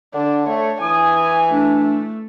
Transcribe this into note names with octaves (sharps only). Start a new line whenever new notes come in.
D3 D4
A3 C#5
E3 G#5 D#6
A3 D4